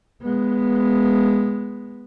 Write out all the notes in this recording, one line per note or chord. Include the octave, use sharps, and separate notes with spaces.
G#3 B3